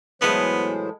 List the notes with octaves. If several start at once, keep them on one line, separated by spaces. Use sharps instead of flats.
A2 E3 F#3 G#3 B3 C5